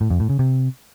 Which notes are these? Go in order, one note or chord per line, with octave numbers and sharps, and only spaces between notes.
A2
F2
A2
C#3
C3